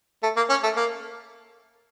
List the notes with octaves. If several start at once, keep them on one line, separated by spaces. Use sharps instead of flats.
A3
A#3
C#4
A3
A#3